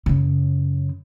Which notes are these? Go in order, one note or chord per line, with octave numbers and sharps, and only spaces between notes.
F#2 C#3